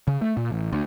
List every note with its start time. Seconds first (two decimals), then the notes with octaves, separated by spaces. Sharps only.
0.08 C#3
0.22 A3
0.37 A#2
0.52 A1
0.73 D2